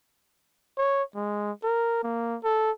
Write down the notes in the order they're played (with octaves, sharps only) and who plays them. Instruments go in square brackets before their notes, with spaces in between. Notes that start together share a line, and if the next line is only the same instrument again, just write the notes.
[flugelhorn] C#5
G#3
A#4
A#3
A4